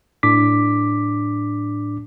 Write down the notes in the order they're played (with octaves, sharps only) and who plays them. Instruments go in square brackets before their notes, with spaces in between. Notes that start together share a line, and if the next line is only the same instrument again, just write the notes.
[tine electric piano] A2 D4 D6 B6